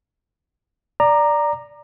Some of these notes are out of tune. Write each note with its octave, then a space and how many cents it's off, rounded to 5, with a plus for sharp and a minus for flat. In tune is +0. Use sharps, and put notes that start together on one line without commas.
D5 +0 A#5 +0 D6 +30